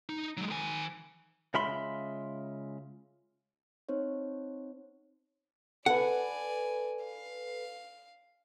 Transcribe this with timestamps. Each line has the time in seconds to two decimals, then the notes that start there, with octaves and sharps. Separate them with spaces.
0.09 D#4
0.37 F#3 G#3
0.50 D#3 G#5
1.54 C#3 G#3 F4 E5 B5 C6
3.89 C4 D#4 C5 C#5
5.86 A4 B4 D5 F#5 G#5
7.04 F5